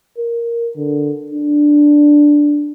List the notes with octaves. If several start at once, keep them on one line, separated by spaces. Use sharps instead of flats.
A#4
D3
D4